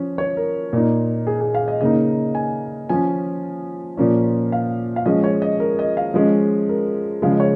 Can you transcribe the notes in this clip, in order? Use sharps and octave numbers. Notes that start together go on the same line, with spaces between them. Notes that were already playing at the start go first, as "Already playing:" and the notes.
Already playing: F3 C#4
C#5
A#4
A#2 A#3 D#4
G#4
G#4
F5
D#5
C#3 A#3 D#4 D#5
G#5
F3 C#4 G#5
A#2 F3 A#3 C#4
F5
F5
F3 G#3 C#4 D#5
C#5
D#5
A#4
D#5
F5
F3 G#3 C#4 D#5
A#4
C#3 F3 G#3 F5
D#5
C#5